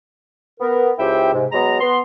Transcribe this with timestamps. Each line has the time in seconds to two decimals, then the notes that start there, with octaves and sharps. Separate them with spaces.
0.60 B3 A#4
0.99 C#2 E4 G4 C5 E5 G5
1.33 G#2 C3
1.52 F#3 G#3 B3 A#5
1.80 B3 C6